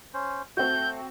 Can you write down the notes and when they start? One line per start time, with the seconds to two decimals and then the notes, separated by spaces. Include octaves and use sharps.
0.14 C#4 C5
0.57 A3 C4 F#4 G6